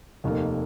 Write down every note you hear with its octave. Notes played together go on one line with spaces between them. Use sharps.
F1 D#2 D#3 A#3